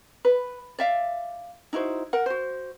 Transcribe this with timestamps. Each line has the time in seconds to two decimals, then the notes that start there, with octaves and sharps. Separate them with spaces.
0.25 B4
0.79 D5 E5 F5
1.73 D#4 E4 F#4 C5
2.13 A#4 F#5
2.26 F#4 C5